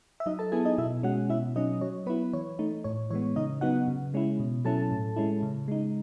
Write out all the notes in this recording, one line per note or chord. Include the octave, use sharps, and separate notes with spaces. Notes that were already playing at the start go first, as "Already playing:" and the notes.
E5
F#3 D#4 D#5
A4 A5
B3 E4 G#4 G#5
D#4 D#5
B2 E4 E5
G#3 C#4 F#4 F#5
B2 E4 E5
F#3 C#4 D#4 D#5
F#3 C#5
B3 E4 B4
E3 C#5
A3 D#4
A2 C#5
E3 G#3 B3 C#5
C#3 D#4 D#5
F#3 B3 D#4 F#4 F#5
C#3
G#3 C#4 E4
B2
F#3 C#4 E4 A4 A5
A2
G#3 C#4 E4
C#3
G#3 D#4